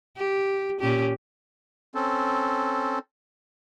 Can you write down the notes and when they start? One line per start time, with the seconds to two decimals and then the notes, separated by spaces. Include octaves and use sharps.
0.17 G4
0.80 A#2 C#4 G4
1.95 C4 C#4 A4